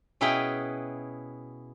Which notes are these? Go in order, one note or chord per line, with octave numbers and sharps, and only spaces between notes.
B2 C#4 E4 G#4 B4 G5